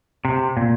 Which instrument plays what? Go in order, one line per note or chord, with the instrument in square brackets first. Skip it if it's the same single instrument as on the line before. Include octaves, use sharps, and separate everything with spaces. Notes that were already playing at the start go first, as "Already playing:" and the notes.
[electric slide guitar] C3
A#2